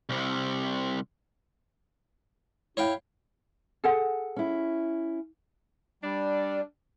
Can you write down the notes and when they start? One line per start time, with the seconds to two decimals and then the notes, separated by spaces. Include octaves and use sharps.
0.09 C2 C3
2.77 E4 C#5 F5 G5
3.84 G#4 A4 F#5
4.36 C#4 E4
6.03 G3 D4